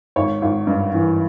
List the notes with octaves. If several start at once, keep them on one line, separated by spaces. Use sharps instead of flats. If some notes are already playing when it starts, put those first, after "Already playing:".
G#1 C#5
G#1
G2
E3